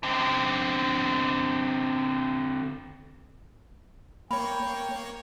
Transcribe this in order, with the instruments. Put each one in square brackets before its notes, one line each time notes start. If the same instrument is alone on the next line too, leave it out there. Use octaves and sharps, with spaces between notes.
[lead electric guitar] D3 C4
[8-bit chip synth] A#3 C#5 [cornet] G5 [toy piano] B5